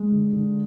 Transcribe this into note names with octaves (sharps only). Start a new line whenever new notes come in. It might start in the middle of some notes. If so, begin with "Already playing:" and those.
Already playing: G#3
D3
D3